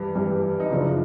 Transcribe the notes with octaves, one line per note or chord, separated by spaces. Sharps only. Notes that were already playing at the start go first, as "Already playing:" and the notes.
Already playing: G2 E3 G3
G2 E3 G3
D#4
F#2 C#3 F3 D4